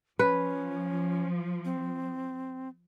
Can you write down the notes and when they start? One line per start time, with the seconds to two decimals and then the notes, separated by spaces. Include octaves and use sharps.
0.19 F3 C#4 B4
1.65 C4